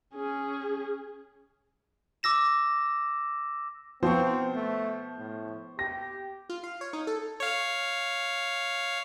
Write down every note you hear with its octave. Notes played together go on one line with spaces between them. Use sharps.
C#4 G#4
D6 E6 A#6 E7
F3 B3 C4 C5 C#6
A3
A2
G4 A#6
F4
F5
C#5
D#4
A4
C#5 F5